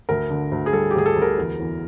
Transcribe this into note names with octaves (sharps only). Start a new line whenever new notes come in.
D2 A#4
D3
D2
G#4
G3 A4
G4
D2 G#4
A4
D2
A#4
E2
E2